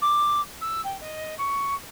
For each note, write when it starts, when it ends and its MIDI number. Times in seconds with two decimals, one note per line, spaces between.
0.01 0.41 86
0.61 0.81 88
0.84 1.00 79
1.00 1.34 75
1.37 1.74 85